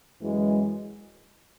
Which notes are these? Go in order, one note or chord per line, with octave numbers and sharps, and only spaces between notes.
F#2 E3 G#3